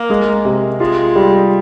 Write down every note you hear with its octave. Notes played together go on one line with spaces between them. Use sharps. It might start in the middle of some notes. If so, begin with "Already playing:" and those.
Already playing: A#3 A#4
G#3
C3
G#3 F4
G3